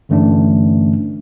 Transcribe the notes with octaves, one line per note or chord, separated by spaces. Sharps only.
G2 D3 E3 A3 C#4 D4